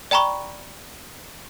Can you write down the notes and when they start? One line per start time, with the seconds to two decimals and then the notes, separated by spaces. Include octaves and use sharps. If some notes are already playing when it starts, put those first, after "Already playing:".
0.11 D5 G5 A#5 B5 C#6